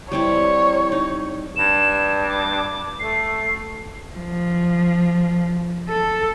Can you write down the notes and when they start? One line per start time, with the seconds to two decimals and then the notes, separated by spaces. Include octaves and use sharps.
0.12 G3 C4 E4 C#5
0.92 D#4
1.56 G2 E7
2.28 D6
2.99 A3 C7
4.15 F3
5.89 A4